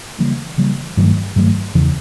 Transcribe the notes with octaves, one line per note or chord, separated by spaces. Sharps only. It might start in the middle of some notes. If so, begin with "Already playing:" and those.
C#3 E3 G3 A#3
C#3 E3 G3 A#3
G2 D#3 F#3 A3
G2 D#3 F#3 A3
E2 C#3 E3